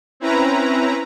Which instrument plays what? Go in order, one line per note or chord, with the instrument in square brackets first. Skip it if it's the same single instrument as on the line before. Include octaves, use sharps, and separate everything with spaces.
[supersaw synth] C4 C#4 E4 B4 A#5